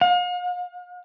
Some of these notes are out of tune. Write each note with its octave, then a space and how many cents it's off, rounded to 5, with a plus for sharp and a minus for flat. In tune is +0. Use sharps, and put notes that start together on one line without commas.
F5 +40